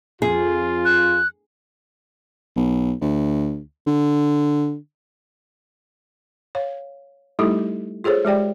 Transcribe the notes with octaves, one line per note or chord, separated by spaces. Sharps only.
F2 F4 G#4
F#6
B1
D2
D3
C#5 F5
G3 A3 D#4 E4 G4 A4
F4 G#4 A4 C5 C#5
G#3 G4 D5 G5